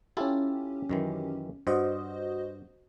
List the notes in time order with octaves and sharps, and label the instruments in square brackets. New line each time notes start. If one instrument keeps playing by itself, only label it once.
[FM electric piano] C#4 G4 [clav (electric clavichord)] E4 F4 A4
[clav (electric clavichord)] F#2 D#3 E3
[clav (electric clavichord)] G2 [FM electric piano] F#4 C5 D#5